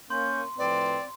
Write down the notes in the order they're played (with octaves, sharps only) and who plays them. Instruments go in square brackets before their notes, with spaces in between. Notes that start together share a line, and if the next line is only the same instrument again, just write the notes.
[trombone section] A#3 [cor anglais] C#4 [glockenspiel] C6 [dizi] G6
[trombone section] A2 F3 B4 [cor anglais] C4 [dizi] D5